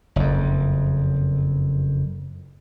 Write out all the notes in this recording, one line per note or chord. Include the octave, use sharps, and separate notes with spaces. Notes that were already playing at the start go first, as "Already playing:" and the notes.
F#1 F2